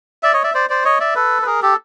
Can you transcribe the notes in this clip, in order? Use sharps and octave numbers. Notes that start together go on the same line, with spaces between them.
D5 E5
C#5 D#5
D5 E5
C5 D5
C5 D5
C#5 D#5
D5 E5
A4 B4
B4
G#4 A#4
G4 A4